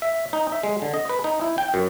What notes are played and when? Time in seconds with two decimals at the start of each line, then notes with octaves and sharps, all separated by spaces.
0.02 E5
0.33 D#4
0.52 E5
0.63 G#3
0.82 D3
0.94 D#5
1.09 B4
1.24 D#4
1.41 E4
1.58 G5
1.74 F#2